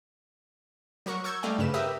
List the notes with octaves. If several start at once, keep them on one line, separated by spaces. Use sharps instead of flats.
F#3 F#4 A#4 C#6
C#6 E6 G6 G#6
G3 A3 D5 D#5 F5 G5
G2 C#3 B4 E7
G4 A#4 B4 E5 D#6